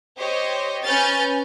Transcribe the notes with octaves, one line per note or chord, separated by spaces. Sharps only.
G4 C5 C#5 D#5
C#4 B4 F6 G6 A6